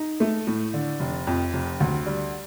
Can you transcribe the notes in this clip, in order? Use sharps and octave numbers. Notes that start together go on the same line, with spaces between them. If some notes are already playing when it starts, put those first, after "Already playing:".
Already playing: D#4
A3
A2
D3
F1
F2
F1
D2
G3